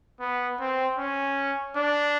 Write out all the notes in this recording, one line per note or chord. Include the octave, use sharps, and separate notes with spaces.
B3
C4
C#4
D4